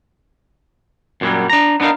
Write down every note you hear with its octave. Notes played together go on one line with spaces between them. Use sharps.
F#2 A#2 D#3 F#3 G3
D4 A#5
B3 D4 D#4 A#4 F5